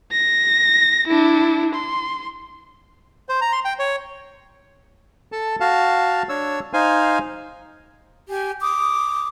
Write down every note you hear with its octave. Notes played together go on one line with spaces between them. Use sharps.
A#6
D4 E4
C6
C5
A#5
C6
G5
C#5
A4 A5
F#4 F5 A5
D4 C#5 E6
D#4 C5 F5 G#5
G4 G#5
D6 D#6